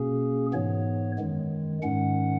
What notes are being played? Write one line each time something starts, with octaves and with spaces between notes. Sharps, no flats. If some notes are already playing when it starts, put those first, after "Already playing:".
Already playing: B2 A#3 C#4 G#4
G#2 E3 B3 C#5
F#2 D#3 G#3
G#2 D#3 G#3 C#4 F#5